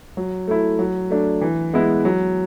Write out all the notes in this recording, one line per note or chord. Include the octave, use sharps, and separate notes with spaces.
F#3
A3 E4
F#3
A3 D4
E3
G#3 B3 E4
F#3